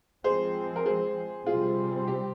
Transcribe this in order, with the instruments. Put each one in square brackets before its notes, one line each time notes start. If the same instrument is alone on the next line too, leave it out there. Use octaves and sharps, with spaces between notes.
[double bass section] F3 G#3 C4 [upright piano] G#4 C5
[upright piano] A#4
G#4 C5
[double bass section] C3 G3 C4 [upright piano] F4 G#4
[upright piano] G4